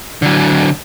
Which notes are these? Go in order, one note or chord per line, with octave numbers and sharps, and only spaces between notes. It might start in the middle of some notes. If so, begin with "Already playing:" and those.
D3 F#3